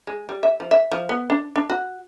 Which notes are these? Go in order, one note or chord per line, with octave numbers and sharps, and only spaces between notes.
G#3
G3
E5
F3
E5
F3
B3
D4
D4
F#4